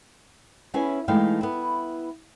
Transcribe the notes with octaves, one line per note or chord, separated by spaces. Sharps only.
B3 C#4 E4 G#4 B4 G#5
E3 G#3 A3 D#4 F5 G5
B3 E4